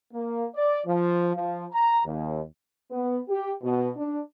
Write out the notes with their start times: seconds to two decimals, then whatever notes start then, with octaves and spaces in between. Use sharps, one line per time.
0.14 A#3
0.55 D5
0.86 F3
1.35 F3
1.72 A#5
2.05 D#2
2.90 B3
3.29 G4
3.63 B2
3.96 D4